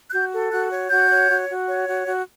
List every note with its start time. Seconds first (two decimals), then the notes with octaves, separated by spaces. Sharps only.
0.08 F#6
0.12 F#4 G6
0.32 A4
0.51 F#4 F#6
0.71 C#5
0.90 F#4 G6
1.10 C#5
1.29 F#4
1.49 F#4
1.68 C#5
1.87 F#4
2.06 F#4